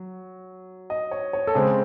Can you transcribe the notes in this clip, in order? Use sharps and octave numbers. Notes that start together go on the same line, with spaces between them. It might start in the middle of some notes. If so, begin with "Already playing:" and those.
Already playing: F#3
D#5
C#5
C#5
A4
C#3 G#3 C4 G#4